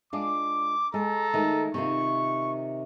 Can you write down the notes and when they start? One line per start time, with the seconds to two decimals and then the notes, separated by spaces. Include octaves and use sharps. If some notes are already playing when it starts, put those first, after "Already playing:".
0.13 G#3 D4 F4 D6
0.94 G#3 A4 A#5
1.34 D#3 G#3 A3
1.74 C3 D#3 F4 C#6